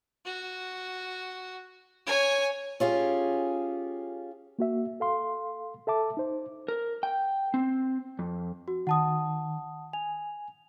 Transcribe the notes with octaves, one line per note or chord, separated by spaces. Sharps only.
F#4
C#5 G#5
C#4 F4 G4 G#4
A#3 F#4 E5
A4 F5 C6
A4 E5 A5 D6
D#4 C5
A#4
G5
C4
F2
F#4
D#3 F#5 A5 D#6
G#5 F7